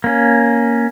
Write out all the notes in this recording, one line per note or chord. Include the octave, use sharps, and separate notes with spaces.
A#3 C#4